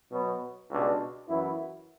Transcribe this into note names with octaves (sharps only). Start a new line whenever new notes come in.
B2 F#3 B3
C#2 B2 G3 D4
F#2 E3 B3 E4